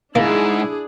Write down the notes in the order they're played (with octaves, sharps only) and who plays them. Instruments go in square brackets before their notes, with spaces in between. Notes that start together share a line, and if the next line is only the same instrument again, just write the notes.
[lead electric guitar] G#2 [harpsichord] A#3 [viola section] D4 G#4 [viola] E4